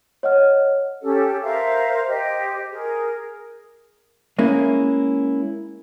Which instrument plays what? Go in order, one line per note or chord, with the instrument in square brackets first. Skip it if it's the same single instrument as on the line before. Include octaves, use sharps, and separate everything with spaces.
[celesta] C#5 D#5 F#5 F6
[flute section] C#4 G4 A4
A#4 C5 E5 F5
G4 C5 D#5
G#4 A#4
[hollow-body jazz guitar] G#3 A#3 C#4 E4